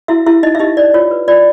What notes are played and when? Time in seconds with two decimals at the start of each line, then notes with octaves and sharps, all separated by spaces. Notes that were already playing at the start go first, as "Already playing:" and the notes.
0.08 E4 F#4 E5
0.26 E4 G4 E5
0.43 D#4 D#5
0.55 E5
0.59 D#4 G4 D#5
0.77 D#4 D5
0.94 F4 C#5
1.11 B4
1.28 F4 D5